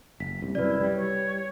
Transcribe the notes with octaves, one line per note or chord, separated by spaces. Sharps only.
F#1 B6
C2
C2 F#2 E4 B4 D5
G3
C#5